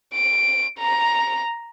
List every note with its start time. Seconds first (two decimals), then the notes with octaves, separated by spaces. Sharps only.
0.15 D7
0.79 A#5